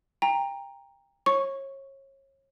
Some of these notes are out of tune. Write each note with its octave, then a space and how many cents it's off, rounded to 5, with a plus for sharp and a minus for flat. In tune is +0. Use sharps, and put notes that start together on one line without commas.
G5 +25 A#5 +0
C#5 -30 C#6 +0